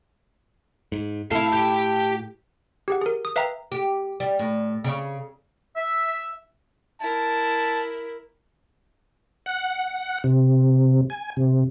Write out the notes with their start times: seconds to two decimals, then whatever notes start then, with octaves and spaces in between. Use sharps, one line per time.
0.92 G#2
1.31 A2 E4 A4 F5
1.53 G4
2.88 G4 G#4 F#5
3.02 G#4 A#4
3.25 D#6
3.36 B4 E5 F5 G5 A#5
3.72 G4
4.20 G3
4.39 A2
4.84 C#3
5.76 E5
7.01 E4 A#4 A5
9.46 F#5
10.24 C3
11.10 G#5
11.37 C3